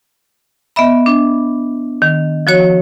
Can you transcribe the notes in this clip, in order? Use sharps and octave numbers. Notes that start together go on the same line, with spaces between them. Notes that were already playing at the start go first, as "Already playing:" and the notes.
B3 D#5 E5 B5
D4
D#3
F3 F#4 C#5